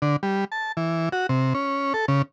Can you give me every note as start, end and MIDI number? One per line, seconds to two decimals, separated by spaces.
0.02 0.16 50
0.23 0.45 55
0.52 0.72 81
0.77 1.09 52
1.12 1.27 66
1.29 1.54 48
1.54 1.93 61
1.94 2.06 69
2.08 2.22 49